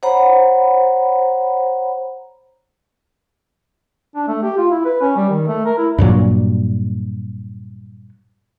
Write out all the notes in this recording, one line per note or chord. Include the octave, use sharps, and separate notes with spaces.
C5 C#5 F#5 A#5 B5
D4
A3
G4
F4
E4
B4
C#4
G3
D#3
A3
A#4
E4
G2 A#2 F#3